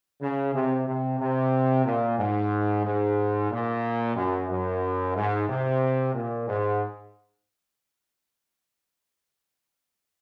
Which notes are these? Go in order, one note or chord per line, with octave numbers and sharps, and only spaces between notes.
C#3
C3
C3
C3
A#2
G#2
G#2
A#2
F#2
F#2
G#2
C3
A#2
G#2